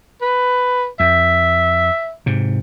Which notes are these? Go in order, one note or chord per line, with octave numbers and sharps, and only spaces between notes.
B4
F2 E5
G#2 C3